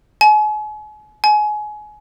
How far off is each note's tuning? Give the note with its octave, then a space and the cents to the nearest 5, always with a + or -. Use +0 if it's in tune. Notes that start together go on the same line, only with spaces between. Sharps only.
G#5 +40
G#5 +25